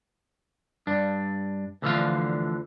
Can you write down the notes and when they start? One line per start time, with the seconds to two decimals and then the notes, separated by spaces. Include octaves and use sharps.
0.87 G2 D4
1.82 D2 D3 E3 F3 F4 F5